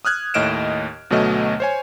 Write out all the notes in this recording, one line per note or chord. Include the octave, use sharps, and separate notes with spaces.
D#6 F6 F#6 G#6
D#2 A2 D#5 F6 D7 E7
D2 B2 F#3 A3 D#5 F6
C5 C#5 G#5